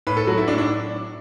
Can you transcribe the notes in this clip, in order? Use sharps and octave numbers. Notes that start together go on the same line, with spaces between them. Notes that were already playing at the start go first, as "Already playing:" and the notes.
A2 B4
A4
F#3 F#4
E4
A2 D4
D4